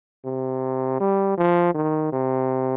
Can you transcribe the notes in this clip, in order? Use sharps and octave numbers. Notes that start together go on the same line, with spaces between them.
C3
G3
F3
D#3
C3